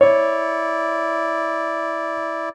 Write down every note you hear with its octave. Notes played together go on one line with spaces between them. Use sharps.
E4 C#5 D5